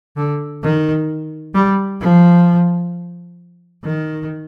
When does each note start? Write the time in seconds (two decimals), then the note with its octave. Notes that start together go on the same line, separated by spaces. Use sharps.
0.17 D3
0.63 D#3
1.54 G3
2.01 F3
3.84 D#3